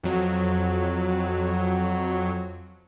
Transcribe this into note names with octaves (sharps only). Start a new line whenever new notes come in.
F2 F#3